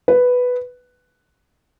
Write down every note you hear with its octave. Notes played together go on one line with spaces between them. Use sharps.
B4